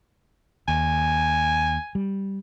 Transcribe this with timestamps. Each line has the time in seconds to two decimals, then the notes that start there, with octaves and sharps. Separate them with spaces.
0.68 D#2 G#5
1.95 G3